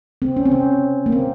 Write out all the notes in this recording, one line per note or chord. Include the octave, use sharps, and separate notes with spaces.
C4
C#4
C4
C#4
A#3
C4